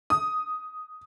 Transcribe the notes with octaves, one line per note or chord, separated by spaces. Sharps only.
D#6